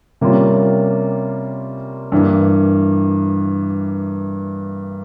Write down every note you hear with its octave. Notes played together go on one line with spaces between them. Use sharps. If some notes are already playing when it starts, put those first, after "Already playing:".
C3 G3 A#3 C#4 F4
G2 E3 A#3